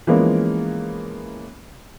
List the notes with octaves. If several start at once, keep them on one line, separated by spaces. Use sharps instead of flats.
E3 F3 G#3 A#3 B3 C#4